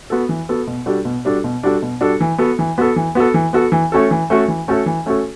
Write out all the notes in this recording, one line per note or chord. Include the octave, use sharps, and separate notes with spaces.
B3 F#4 A4
E3
B3 F#4 A4
B2
G3 D4 F#4 A4
B2
G3 D4 F#4 A4
B2
G3 D4 F#4 A4
B2
G3 D4 F#4 A4
E3
B3 F#4 A4
E3
B3 F#4 A4
E3
B3 F#4 A4
E3
B3 F#4 A4
E3
A3 C#4 F#4 A4
E3
A3 C#4 F#4 A4
E3
A3 C#4 F#4 A4
E3
A3 C#4 F#4 A4